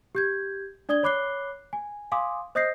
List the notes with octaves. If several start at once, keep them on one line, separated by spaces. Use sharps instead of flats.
G4 G6 G#6
D4 D5 D#6 G#6 G7
C#5 B5 D6 F#6 C7 G7
G#5
F5 G#5 C6 D6 D#6
C5 D#5 D#6 G6 A#6 C7